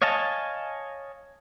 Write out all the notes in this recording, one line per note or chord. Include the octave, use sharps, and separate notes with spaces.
C#5 D#5 F5 G#5 A5